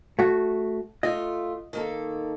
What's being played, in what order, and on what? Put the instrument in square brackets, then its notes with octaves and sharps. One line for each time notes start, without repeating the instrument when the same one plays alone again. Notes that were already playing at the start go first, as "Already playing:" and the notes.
[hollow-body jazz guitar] A3 F#4
[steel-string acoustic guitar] A3 F4 [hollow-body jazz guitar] D#5
[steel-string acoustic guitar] D#3 A#3 A4